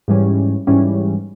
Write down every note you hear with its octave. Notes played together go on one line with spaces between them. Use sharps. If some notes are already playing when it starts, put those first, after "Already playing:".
G#2 E3 G3 C#4
G#2 E3 G3 C#4